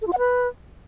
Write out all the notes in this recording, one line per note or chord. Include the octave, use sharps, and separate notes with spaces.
A4
F4
F#5
B4